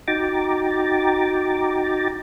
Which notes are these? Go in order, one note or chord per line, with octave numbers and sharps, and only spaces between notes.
D#4 F#4 G5 A#5 D6 A6